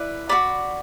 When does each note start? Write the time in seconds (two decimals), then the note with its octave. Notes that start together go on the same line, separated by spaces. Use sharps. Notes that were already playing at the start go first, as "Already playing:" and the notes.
Already playing: E4 B4 D5
0.29 F#4 A4 D5 B5